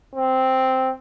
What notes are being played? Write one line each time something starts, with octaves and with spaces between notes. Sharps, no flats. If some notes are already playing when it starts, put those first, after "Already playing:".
C4